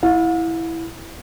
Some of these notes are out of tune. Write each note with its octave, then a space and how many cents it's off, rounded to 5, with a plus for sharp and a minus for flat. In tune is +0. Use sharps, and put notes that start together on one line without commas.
E4 +0 F5 +45